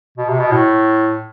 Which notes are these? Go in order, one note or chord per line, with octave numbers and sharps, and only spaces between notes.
B2
C3
B2
A2